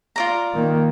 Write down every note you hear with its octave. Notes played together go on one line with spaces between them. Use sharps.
F4 D5 A#5
D#3 A#3